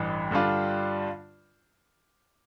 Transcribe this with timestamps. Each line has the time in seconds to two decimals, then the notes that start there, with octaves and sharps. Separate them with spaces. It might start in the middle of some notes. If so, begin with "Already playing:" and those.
Already playing: A1 G2 E3
0.31 G2 D3 G3 D4 F4